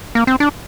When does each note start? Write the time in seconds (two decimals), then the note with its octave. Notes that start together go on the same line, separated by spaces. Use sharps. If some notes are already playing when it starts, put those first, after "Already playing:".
0.15 A#3
0.27 C4
0.40 D4